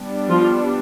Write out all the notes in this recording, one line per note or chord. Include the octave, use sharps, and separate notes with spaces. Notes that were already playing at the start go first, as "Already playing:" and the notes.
Already playing: G3 B3 D4
F3 F4